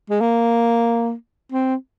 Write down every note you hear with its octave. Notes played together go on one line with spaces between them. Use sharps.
G#3
A#3
C4